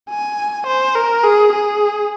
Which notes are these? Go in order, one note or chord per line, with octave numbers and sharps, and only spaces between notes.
G#5
C5
A#4
G#4
G#4